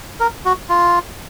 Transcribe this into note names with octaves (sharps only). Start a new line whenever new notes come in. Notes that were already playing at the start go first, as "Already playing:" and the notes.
A#4
F#4
F4